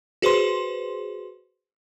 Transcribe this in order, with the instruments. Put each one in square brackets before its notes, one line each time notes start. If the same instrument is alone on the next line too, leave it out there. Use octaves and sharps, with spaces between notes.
[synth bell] F#4 G#4 B4 C5 C6